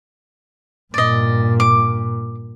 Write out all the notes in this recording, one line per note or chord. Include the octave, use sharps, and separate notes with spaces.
G2 A#2 D5 D#5
D6